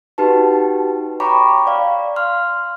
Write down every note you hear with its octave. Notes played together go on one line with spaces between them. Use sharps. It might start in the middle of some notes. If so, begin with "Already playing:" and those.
D#4 F#4 G4 B4 A5
C#5 G5 A#5 B5 C#6 D6
D5 F5
C6 F6